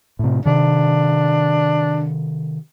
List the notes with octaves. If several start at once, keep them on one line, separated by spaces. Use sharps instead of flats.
A2 C3
C3 D#3 D4